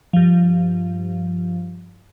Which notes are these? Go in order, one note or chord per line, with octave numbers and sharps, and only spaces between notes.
G2 F3